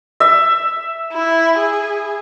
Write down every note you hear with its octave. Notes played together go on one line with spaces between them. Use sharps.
E5
E4
G#4